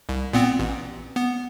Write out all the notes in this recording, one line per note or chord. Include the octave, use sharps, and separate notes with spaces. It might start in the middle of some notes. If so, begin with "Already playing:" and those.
C2
A#2 B3 C4
A1
B3